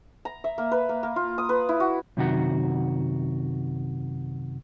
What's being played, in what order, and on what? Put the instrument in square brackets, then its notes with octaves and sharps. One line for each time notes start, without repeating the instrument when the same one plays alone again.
[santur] A#5
E5
A#3
B4
A#3
A#3
F4
D#6
B4
E4
F#4
[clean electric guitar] F#2 C3 D#3 F#4 F#5